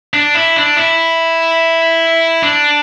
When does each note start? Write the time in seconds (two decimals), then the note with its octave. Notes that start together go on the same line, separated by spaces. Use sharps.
0.14 D4
0.35 E4
0.56 D4
0.76 E4
2.43 D4